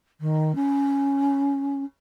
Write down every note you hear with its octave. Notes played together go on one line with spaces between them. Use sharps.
D#3
C#4